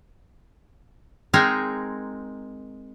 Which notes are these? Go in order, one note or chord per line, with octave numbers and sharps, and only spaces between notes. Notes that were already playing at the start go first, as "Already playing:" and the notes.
G#3 C4 D#4 G#4 A#4